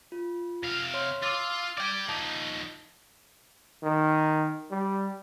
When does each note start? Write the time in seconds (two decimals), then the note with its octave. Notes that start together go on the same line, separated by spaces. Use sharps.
0.12 F4
0.63 C3 F5
0.94 C#5 C6
1.22 F4 C6 D6 E6
1.78 D5 G5 D6 G#6 A6
2.09 F3 D#4 A5
3.83 D#3
4.71 G3